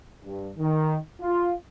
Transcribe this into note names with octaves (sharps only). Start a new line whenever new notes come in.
G2
D#3
F4